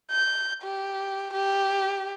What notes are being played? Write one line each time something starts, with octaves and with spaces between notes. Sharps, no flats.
G6
G4
G4